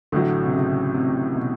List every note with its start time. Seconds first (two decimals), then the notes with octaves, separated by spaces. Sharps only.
0.12 A1 A2 D3 F#3
0.44 C3
0.54 C#3
0.94 C3
1.35 B2